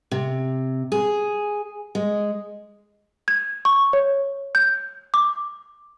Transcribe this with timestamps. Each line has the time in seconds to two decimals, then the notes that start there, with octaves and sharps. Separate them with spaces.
0.11 C3
0.92 G#4
1.95 G#3
3.28 G#6
3.65 C#6
3.93 C#5
4.55 G6
5.14 D6